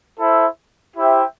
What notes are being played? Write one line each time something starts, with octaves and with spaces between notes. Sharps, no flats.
E4 A4 C5 E5
E4 G4 C5 E5 G5